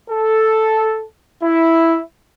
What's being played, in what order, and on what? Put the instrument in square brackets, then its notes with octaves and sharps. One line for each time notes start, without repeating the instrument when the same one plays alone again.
[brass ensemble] A4
E4